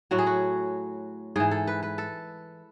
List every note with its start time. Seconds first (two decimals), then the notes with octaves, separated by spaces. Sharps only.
0.11 A2 F#3 F#4
0.18 G#4
0.26 F#4
1.36 G#2 E3 G#4
1.51 A4
1.67 B4
1.83 B4
1.98 A4